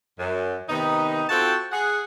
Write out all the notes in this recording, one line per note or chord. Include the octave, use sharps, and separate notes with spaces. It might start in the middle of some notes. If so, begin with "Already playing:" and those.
F#2
C3 D#3 B3 D#4
C4 F4 F#4 A4 G5 A5
G#4 F#5